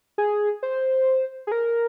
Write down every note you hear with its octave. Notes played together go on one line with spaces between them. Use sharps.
G#4
C5
G#4
A#4